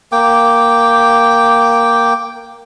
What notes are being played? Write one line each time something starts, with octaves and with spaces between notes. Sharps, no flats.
A#3 G5 D6